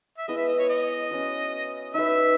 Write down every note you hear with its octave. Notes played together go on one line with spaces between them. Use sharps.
E5
G#3 B3 E4 D#5
E5
D#5
C#5
D#5
C#4 F#4 C#5
D#4 F#4 B4 E5